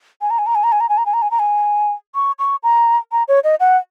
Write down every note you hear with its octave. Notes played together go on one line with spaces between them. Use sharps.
G#5
A#5
G#5
A#5
G#5
A#5
G#5
A#5
G#5
A#5
G#5
A#5
G#5
A#5
G#5
C#6
C#6
A#5
A#5
C#5
D#5
F#5